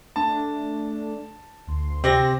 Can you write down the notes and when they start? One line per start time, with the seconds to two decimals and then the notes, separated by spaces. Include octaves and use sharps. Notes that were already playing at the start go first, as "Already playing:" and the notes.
0.16 A3 D4 A5
1.67 D2 C6
2.04 C3 C4 G4 A#6